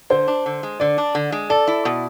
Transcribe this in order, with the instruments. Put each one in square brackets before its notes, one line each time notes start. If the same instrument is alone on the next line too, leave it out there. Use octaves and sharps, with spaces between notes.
[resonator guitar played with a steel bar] D3 [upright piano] C5
[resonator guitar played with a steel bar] D4
D3
G#3
[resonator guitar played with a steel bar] D3 [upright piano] D5
[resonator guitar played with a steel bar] D4
D3
G#3
[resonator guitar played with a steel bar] A4 [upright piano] D5
[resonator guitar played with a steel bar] E4
B2